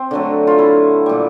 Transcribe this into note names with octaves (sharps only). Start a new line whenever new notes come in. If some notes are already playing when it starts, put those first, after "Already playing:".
Already playing: C4
D3 F#3 A3
F4
E4
A#2 G3